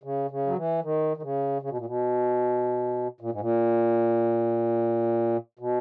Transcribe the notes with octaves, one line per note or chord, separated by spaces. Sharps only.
C#3
C#3
F#3
E3
D#3
D#3
C#3
C#3
B2
A#2
B2
A#2
G#2
A#2
B2